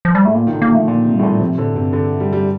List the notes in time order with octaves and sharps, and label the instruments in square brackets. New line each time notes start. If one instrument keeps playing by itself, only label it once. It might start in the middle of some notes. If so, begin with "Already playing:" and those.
[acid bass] F3
G3
[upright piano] A2 [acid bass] A3
[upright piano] A#2 [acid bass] A#3
[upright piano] D#3
D3
[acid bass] A#3
[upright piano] F3 [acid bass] A3
[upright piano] A#2 [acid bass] A#3
[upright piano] C3
[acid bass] G3
[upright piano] A2
A#2
[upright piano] C3 [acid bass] F3
[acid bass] A2 [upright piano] D3
[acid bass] G2 [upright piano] C3
[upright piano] D3
G3
G3